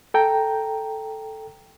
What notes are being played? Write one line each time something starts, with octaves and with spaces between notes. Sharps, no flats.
A4 G5 A#5